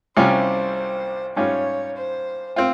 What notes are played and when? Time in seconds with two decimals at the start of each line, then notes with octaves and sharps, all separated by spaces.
0.17 C2 C3 G3 C#4 F4 C5
1.36 G#2 G3 C#4 F4 C#5
1.96 C5
2.56 C4 F4